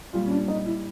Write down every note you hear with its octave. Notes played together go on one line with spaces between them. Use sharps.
A#2 G3 F4
C#4
D4
D#4
E4